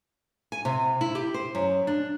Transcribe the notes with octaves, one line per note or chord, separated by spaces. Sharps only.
G#5
C3
E4
G4
C5
F#2
D4